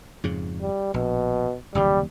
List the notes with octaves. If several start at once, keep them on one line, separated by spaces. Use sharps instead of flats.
F2 G#2 C#3
G3
A#1 B2
F#1 D#2 C3 G3